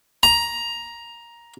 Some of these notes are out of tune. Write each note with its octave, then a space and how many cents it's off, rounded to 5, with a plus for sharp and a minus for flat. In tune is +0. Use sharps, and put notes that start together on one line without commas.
A#5 +10